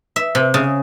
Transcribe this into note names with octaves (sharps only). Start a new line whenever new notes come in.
E5
C3
C#3